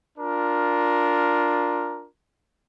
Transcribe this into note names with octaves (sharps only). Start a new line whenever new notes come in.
D4 F4 A#4